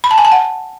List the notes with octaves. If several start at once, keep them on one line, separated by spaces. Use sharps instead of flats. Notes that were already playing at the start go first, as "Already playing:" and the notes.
B5
A5
G#5
A5
F#5